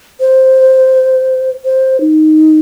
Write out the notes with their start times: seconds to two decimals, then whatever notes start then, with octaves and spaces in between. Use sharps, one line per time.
0.21 C5
1.65 C5
2.01 D#4